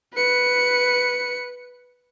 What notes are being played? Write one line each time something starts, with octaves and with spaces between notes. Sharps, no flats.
B4 C#7